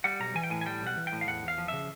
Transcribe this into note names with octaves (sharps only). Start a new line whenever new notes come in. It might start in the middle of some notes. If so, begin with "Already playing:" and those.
G3 F#5
B1 A#5
E3 G#5
G5
A2 G#5
G#5
G3 G5
B1
F#5
E3
G5
A2
F5
E2 F#5
E2 F5
F3
C#3 E5